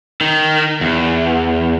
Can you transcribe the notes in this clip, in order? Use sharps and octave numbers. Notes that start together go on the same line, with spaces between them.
D#3
E2